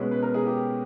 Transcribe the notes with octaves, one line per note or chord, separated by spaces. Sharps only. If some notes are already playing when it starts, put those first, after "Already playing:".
Already playing: B2 G#3 C#4 B4
B4
A#4
G#4
G4